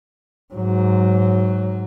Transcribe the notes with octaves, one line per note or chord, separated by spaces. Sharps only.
G#2 F#3